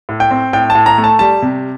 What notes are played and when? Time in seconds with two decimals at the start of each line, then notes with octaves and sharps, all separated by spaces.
0.09 A2
0.20 G5
0.31 C4
0.53 A2 G5
0.70 A5
0.75 A2
0.86 A#5
0.98 A3
1.04 A5
1.19 G3 A5
1.42 C3